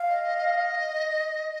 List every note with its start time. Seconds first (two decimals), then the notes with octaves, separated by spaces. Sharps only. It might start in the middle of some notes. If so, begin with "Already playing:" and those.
Already playing: F5
0.09 D#5
0.23 D#5
0.38 D#5